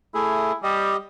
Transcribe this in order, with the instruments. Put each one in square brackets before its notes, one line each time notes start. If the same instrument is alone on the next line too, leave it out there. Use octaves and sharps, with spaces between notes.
[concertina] A3 G#4 [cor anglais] E4
[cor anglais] G3 [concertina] G4 D#5